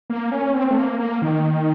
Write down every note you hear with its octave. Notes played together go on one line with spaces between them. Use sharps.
A#3
C#4
C4
A3
A#3
A#3
D#3